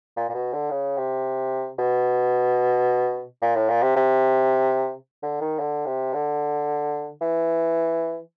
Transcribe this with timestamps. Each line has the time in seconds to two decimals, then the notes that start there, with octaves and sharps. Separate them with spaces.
0.17 A#2
0.29 A#2
0.34 B2
0.53 D3
0.70 C#3
0.98 C3
1.79 B2
3.42 A#2
3.56 A2
3.69 A#2
3.82 C3
3.96 C3
5.23 D3
5.41 D#3
5.59 D3
5.86 C3
6.14 D3
7.21 E3